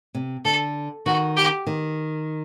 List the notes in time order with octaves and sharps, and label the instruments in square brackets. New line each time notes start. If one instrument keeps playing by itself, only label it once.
[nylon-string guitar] C3
[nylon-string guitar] D3 [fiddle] A4
[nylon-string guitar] D#3 [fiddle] F#4
[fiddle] G4
[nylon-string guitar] D#3